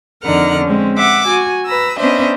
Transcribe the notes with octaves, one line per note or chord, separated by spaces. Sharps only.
F2 D3 D#4 A#4 F#5 F6
G#3 C4 C#4
E5 F#5 D6 E6
F#4 G#5
B4 A#5 E6
B3 C#4 D4 C5 D#5 E5